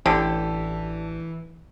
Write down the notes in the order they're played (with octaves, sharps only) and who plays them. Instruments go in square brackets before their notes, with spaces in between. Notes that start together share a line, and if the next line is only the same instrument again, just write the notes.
[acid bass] A1 [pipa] D3 [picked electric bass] E3 [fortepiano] G4 A4 G5